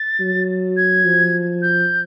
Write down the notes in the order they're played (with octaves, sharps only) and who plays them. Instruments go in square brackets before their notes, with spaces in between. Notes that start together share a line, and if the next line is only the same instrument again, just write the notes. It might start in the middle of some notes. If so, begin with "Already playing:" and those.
Already playing: [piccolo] A6
[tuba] F#3
[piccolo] G#6
[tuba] F3
[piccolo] G6